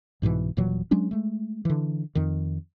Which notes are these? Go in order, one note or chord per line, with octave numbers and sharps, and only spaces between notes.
C2 G#2 B2 E3
D#1 A#2 E3 F#3
F#3 G#3 C#4 D4
G#3 A3
D3 E3
F2 D#3